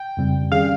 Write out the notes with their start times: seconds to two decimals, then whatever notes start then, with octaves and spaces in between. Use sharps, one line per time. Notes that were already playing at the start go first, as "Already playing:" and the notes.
Already playing: G5
0.17 F2 C#3 G3 C4
0.52 D#3 G3 C#4 G#4 F5